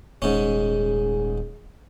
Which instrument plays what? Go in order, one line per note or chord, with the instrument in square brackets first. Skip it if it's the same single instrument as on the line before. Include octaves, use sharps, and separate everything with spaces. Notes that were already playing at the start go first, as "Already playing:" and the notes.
[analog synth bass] D#1 [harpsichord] G#2 C#4 [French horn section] G#4